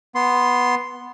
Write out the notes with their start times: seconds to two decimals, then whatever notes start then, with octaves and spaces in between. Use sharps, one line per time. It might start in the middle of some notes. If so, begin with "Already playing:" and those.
0.15 B3 C6